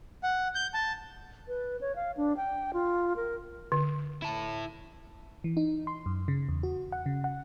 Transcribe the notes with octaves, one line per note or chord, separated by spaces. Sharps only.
F#5
G6
A5
B4
C#5
F5
D4
G5
F4
A#4
D3
E4 A5
E3
D#4
C6
F#2
C#3
E2
F#4
F#5
C#3
F#5